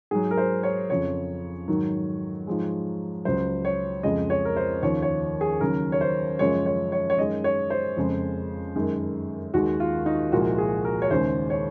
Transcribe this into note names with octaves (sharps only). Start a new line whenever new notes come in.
G#2 F#3 G#4
A#4
C5
C#5
F2 C#3 F3 C#5
G#2 D#3 F#3
G#2 F3 G#3
C#2 C#3 F#3 C5
C#5
F2 C#3 F3 G#3 D#5
C#5
A#4
C5
D#2 C#3 F3 C#5
C#5
G#4
D#2 C#3 F#3 A#4
C#5
C5
F#2 C#3 F3 G#3 C#5
C#5
C#5
C#5
F#2 D#3 G#3 D#5
C#5
C5
F2 C#3 G#3
F#2 D#3 G#3
D#2 D#3 G#3 F#4
F4
D#4
C2 A#2 F3 G#3 F#4
G#4
A#4
C#5
D#2 C#3 G#3 C5
C#5